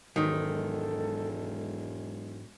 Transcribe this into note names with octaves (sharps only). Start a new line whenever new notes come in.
E1 G#2 D#3 F#3 A4